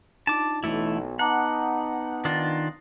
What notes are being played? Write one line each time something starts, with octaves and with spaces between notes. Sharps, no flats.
D4 D#4 F4 A5 D6
B1 E3 A3 E4
B3 D#4 F#5 A5 A#5 D6
D#3 D4 F4 D#6 A6 A#6